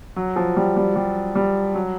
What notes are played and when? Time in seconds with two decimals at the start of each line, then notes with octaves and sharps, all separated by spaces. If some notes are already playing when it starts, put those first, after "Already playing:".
0.16 F#3
0.36 F3
0.56 G3
0.76 G3
0.96 G3
1.35 G3
1.75 F#3